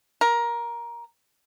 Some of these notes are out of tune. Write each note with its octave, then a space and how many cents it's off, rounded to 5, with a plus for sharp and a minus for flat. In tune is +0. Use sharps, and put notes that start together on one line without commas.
A#4 +15